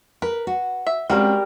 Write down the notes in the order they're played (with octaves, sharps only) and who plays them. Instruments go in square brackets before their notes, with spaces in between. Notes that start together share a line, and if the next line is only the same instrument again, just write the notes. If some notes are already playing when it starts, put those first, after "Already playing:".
[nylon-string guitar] A#4 [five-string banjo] B4
[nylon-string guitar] F#4
[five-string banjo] E5
[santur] G3 A#4 [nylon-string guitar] G#3 C4 C#4 [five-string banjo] F4 F#4